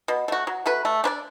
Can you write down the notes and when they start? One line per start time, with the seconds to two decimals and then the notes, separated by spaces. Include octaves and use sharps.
0.08 B2
0.28 A3 F#4
0.47 F#3
0.66 A3 F#4 B4
0.85 A3
1.04 D4 B4 D5